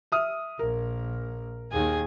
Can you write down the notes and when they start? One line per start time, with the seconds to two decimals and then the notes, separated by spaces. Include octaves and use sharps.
0.12 E5 D#6 F6
0.59 A#1 A#4
1.71 D#2 D#3 G#4 G#5